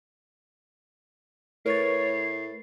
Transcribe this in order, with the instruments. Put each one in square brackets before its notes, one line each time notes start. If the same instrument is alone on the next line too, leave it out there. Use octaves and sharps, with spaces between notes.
[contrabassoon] A2 [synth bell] A#4 B4 A6 [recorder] C#5 [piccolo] C7